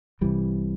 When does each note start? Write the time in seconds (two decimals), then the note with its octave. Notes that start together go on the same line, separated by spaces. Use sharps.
0.21 C2 C3 E3 G3